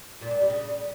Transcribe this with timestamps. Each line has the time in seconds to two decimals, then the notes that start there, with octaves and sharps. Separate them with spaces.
0.21 A#2
0.31 D4
0.40 G3
0.50 C#3